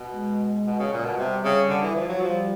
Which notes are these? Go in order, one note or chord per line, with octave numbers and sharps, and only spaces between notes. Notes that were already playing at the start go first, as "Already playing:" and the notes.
Already playing: B2
G#3
B2
C#3
A#2
B2
C3 G3
C#3
D3
E3
F3
F#3
F3 G3